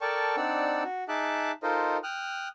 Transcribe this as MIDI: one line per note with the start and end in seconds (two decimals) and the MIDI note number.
0.01 0.36 69
0.01 0.36 70
0.01 0.36 74
0.01 0.36 79
0.01 0.36 81
0.01 0.36 85
0.37 0.83 60
0.37 0.83 62
0.37 0.83 63
0.37 0.83 74
0.37 0.83 78
0.37 0.83 88
0.84 1.04 66
1.08 1.51 63
1.08 1.51 68
1.08 1.51 76
1.08 1.51 81
1.08 1.51 86
1.08 1.51 90
1.63 1.97 63
1.63 1.97 65
1.63 1.97 69
1.63 1.97 70
1.63 1.97 72
1.63 1.97 75
2.04 2.48 79
2.04 2.48 87
2.04 2.48 89
2.04 2.48 90